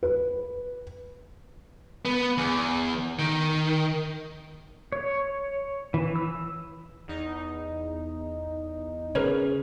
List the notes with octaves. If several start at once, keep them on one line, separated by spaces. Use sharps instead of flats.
B4
B3
E2
D#3
C#5
E3
E6
E2 D#4
C#3 A#4 B4 C#5